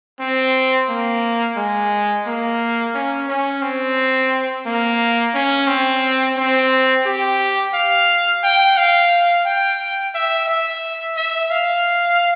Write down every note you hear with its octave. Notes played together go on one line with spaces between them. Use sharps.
C4
A#3
G#3
A#3
C#4
C#4
C4
A#3
C#4
C4
C4
G4
F5
G5
F5
G5
E5
E5
E5
F5